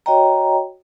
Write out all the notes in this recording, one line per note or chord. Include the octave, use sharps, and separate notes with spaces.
F#4 C#5 D#5 G5 A#5